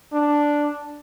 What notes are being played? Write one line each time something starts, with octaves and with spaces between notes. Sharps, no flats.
D4